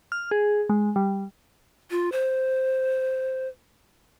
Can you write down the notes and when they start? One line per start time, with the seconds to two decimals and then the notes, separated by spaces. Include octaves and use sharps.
0.12 F6
0.31 G#4
0.70 G#3
0.96 G3
1.91 F4
2.12 C5